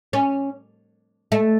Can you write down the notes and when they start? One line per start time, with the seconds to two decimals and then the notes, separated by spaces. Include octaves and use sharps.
0.13 C#4
1.32 A3